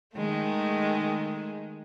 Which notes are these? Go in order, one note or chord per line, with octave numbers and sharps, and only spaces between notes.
D#3 G#3 A3